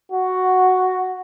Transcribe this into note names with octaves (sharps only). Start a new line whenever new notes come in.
F#4